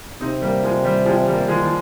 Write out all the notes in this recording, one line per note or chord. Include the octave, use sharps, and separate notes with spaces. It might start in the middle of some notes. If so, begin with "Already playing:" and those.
C3 C4 D#4
G3 A#3
F3 G#3
G3
F3 G#3
G3 A#3
F3 G#3
F3